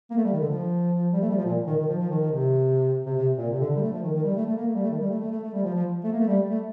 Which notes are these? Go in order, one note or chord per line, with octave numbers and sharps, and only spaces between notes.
A#3
A3
G3
D#3
D3
F3
G3
A3
G3
F3
A#2
D#3
D#3
F3
F3
D#3
D#3
C3
C3
C3
A#2
C3
D3
D3
G3
A3
F3
D#3
D#3
G3
A3
A3
A#3
A3
G3
A3
D#3
G3
A3
A3
A3
A3
G3
F3
F3
A3
A#3
A3
G3
A3